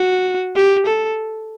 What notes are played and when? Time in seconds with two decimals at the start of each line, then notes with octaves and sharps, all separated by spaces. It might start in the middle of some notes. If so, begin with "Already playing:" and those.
Already playing: F#4
0.56 G4
0.86 A4